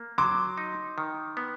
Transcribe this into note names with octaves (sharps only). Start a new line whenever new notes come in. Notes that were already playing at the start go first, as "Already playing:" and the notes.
Already playing: A#3
F#3 C6 D6
D#4
D#3
B3